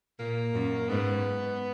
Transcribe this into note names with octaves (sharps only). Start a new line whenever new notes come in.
A#2 A#3
F#2
G#2 B3